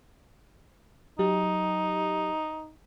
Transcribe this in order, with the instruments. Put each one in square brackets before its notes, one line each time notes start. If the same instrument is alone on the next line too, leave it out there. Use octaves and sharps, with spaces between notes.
[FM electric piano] F#3 G4 [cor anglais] D#4